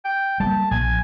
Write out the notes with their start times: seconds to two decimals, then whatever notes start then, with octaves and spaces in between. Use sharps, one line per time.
0.04 G5
0.40 G3 A#3 A5
0.71 A#1 G#5